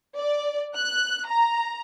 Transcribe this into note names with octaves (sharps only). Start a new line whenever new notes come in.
D5
F#6
A#5